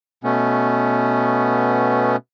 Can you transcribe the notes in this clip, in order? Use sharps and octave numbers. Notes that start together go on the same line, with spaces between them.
B2 A3 B3 C#4